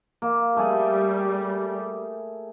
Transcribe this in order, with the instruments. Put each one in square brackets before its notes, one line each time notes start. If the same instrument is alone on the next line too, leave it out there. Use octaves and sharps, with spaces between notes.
[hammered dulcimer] A#3
[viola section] G3 [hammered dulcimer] A3 G#4